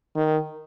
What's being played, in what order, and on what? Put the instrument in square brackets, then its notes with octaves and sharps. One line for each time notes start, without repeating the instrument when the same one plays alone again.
[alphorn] D#3